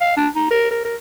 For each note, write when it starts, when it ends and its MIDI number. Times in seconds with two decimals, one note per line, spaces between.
0.01 0.15 77
0.17 0.28 62
0.35 0.49 63
0.50 0.67 70
0.71 0.84 70
0.85 0.95 70